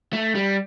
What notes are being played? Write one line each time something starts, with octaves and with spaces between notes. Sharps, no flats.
A3
G3